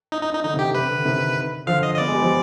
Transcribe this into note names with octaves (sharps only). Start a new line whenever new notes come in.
D#4
D#4
D#4
D3 D#4
C3
G4
D3
C3 B4
D3
C3 D#3
D3 F3 F5
D#5
D#5
B3 D5
G#3
G3
F3